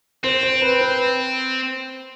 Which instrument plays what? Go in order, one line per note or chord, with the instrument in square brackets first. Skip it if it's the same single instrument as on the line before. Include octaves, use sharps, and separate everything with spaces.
[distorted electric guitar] C4 [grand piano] C5
[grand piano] C5
B4
B4